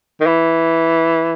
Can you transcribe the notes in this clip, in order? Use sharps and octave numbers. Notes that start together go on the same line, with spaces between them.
D#3
E3